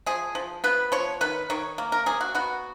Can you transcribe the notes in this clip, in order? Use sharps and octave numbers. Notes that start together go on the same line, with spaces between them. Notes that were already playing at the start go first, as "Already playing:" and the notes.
F3 G#4
F3
B3 B4
F3 C#5
D#3 B4
D#3 C#5
A#3
A#4
A#3 G#4
F#4
B3 F#4